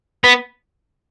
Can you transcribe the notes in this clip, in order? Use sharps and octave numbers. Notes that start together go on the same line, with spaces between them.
B3